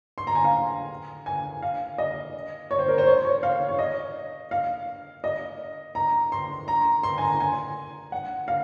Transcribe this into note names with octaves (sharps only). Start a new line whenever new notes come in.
C6
A#5
G#5
F5
G#5
F5
D#5
C#5
C5
A#4
C5
C#5
C#5
F5
C#5
D#5
F5
D#5
A#5
C6
A#5
C6
G#5
A#5
G#5
F#5
F5